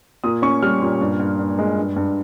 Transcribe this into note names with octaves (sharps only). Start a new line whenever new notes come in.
A#2 D#6
C#4 C#6
G3 F6
A#2
G2
G2
G2
G#3
G2
G2